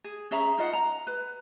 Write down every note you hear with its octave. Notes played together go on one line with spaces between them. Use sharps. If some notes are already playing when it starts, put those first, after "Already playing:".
G#4
C#4 G#4 E5 A#5
D#4 F4 D#5 F#5
A#5
B4